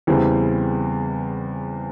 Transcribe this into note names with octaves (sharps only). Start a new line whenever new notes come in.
E2 C#3 E3 G3 C4